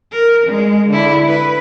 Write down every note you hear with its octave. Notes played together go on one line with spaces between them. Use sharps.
A#4
G#3
D3 E4
B4